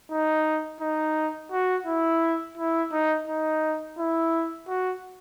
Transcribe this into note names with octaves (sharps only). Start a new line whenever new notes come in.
D#4
D#4
F#4
E4
E4
D#4
D#4
E4
F#4